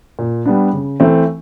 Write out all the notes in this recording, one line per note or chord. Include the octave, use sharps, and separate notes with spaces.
A#2
G3 B3 D4
C#3
E3 A3 C4